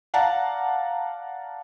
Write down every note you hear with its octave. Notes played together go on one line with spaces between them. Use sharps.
D5 F5 F#5 A5 A#5